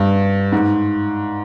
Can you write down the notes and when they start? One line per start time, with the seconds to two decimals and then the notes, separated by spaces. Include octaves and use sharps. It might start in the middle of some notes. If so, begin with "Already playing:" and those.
Already playing: G2
0.52 G#2